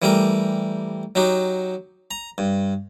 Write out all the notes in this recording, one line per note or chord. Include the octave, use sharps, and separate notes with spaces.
E3 G3 A3 G4 A#4
F#3 D#4 F#4 G4
A#5
G2